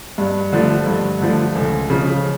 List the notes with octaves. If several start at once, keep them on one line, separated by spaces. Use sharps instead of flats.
G2
D3 F3 A3
G2
D3 F3 A3
C#2
C#3 F3